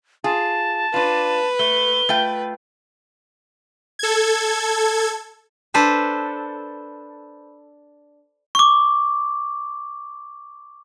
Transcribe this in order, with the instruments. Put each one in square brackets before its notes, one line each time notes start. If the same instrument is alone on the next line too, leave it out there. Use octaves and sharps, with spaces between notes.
[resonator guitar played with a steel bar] F4 G#4 [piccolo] A5
[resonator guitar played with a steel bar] D4 F4 [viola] B4
[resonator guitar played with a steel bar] A3 [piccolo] G7
[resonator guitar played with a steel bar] A3 F4 G5
[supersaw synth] A4 G#6
[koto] D4 A4 B4 C5
[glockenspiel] C#6 D6